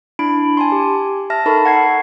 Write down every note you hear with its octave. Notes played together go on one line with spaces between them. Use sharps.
D4 E4 B5 D7
G#5 A5 C6
G4
E5 A5 F6 A#6
D#4 A4 A#4 A5 B5 C#6
F#5 G#6 C7